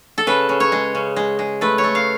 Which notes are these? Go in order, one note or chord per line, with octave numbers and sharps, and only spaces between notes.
A4
C#3 B4
C#3
C#5
G#3
C#3
G#3
G#3
A3 B4
C#5
A3
F5